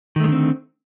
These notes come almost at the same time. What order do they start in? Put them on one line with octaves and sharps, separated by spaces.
D#3 A3 G#3 D3 C4